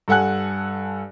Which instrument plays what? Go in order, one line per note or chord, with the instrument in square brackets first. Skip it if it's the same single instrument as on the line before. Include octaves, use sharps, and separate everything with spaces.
[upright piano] G2 A4 F#5 G#5 F#6